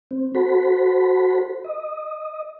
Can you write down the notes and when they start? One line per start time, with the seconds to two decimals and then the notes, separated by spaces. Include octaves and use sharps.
0.11 C4
0.35 F#4 A4 C5 B5
1.64 D#5